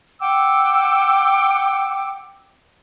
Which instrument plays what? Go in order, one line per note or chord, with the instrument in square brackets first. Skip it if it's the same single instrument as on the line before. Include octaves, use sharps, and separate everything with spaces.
[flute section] F#5 G5 D6 E6